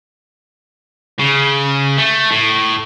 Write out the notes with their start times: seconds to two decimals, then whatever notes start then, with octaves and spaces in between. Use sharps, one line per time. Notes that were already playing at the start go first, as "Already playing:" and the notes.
1.19 C#3
1.98 A3
2.30 A2